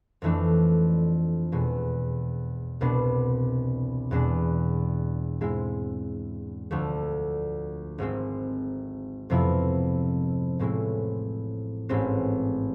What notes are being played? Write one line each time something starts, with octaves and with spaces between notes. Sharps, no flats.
F2 E3 A3 D4
E2 B2 G#3
C2 B2 B3 D4
E2 B2 G#3 D4
G#2 G#3 C4 E4
D2 D3 F3 A3
G#1 G#2 G#3 C4 E4
F2 C3 F3 B3 E4
A1 A2 G#3 C4 E4
A1 G#2 G#3 C4